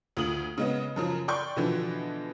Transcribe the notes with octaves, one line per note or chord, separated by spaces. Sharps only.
D2 F4 D#6 F#7
C#3 G#3 B3
F#2 C#3 F3
D5 G5 C6 C#6 G6
B2 D3 E3 F3